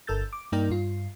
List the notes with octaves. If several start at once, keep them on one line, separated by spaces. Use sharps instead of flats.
G1 A4 A#4 E6 G6 A6
D6
G2 A#3 D#4 A#4 D5 G5
G2 F4